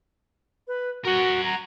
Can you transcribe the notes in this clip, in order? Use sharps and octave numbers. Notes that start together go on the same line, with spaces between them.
B4
F#4 A#4 F#5
A#5